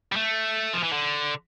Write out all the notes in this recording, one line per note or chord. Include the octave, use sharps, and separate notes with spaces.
G3
A3
F3
E3
D3